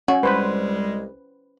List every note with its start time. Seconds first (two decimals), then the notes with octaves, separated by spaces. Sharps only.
0.08 C#4 F#4
0.23 C2 G3 G#3 B4 C5